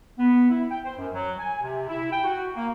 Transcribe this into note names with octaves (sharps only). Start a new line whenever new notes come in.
B3
E4
G5
C5
F#2
F#3
G#5
C3
E4
G5
F#4
A#3